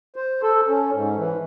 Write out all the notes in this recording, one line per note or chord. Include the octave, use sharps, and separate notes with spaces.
C5
A4
C#4
G#2
E3